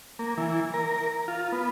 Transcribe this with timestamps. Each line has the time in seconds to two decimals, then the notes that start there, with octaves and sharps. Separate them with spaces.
0.19 A#3
0.37 E3
0.74 A#4
1.28 F4
1.52 B3